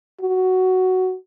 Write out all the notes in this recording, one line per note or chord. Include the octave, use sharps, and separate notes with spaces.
F#4